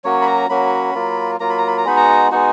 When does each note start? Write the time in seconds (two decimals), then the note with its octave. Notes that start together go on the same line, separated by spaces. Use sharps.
0.04 F#3 A#3 C#4 F#4 C#5
0.22 B5
0.27 A#5
0.49 F#3 A#3 C#4 F#4 B5
0.95 F#3 A#3 F4
1.40 F#3 A#3 F4 A#5
1.49 B5
1.58 A#5
1.68 B5
1.78 A#5
1.85 G#3 B3 D#4 F#4 B5
1.97 A#5
2.31 G#3 B3 D#4 F#4